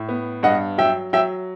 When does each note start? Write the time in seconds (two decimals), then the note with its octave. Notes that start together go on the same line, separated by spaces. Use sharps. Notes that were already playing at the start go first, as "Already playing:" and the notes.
Already playing: A2
0.09 B3
0.43 G2 D#5 F#5
0.78 F#3 E5 G5
1.13 F#3 E5 G5